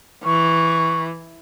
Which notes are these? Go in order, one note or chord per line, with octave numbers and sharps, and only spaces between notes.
E3 C#6